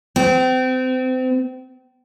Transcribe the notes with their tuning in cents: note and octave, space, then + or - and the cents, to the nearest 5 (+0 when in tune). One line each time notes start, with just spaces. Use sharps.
C4 -30